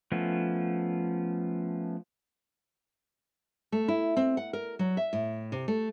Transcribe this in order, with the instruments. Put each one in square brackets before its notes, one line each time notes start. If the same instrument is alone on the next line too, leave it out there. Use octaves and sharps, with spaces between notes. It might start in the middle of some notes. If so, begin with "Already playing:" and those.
[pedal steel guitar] F3 A3 B3 C#4
[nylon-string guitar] A3
E4
C4
F#5
A#4
F#3
E5
A2
C3
A3